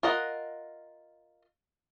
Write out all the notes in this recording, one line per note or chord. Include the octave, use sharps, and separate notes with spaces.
F4 A#4 D#5 F#5